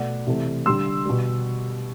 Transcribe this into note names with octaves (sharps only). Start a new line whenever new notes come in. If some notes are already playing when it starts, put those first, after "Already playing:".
Already playing: B2 A3 D5 F#5
C3 E3 A3
D3 G3 C6 E6
B2 G3